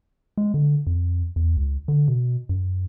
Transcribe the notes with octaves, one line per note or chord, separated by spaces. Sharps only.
G#3
D3
F2
E2
C#2
D3
B2
F#2